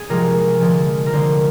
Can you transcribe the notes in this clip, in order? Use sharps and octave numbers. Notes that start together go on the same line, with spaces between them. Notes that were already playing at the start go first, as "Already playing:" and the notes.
Already playing: G#4
C3 F3 G#3 A#4
D3 F3 G#3
A#4
D3 G#3 C5